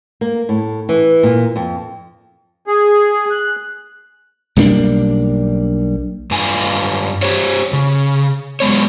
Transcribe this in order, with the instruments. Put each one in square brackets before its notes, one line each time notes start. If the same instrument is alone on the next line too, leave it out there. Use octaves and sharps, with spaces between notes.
[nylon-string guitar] A#3
A2
E3
A#2
F2
[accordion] G#4
F#6
[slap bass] B1 G3 A#3 D4
[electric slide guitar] G2 F4 G#5
G4 C5 C#5
C#3
F#3 G#3 B3 C#5